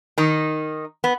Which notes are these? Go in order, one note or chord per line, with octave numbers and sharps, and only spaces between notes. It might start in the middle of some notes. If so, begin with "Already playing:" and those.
D#3 D#4
B3